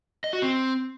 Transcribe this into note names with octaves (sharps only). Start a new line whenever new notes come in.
D#5
F#4
C4